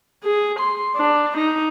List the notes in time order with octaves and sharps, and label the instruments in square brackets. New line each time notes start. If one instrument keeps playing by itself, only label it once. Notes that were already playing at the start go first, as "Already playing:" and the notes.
[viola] G#4
C6
D4
D#4